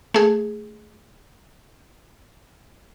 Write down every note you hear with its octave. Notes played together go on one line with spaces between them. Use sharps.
A3 G#4